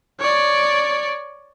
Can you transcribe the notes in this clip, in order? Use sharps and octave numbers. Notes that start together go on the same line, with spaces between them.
C#5 D5